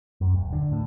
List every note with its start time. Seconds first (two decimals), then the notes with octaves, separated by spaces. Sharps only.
0.21 F#2
0.34 D#1
0.53 D3
0.72 A2